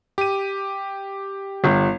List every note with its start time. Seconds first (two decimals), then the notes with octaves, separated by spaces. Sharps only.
0.18 G4 D#7
1.64 G1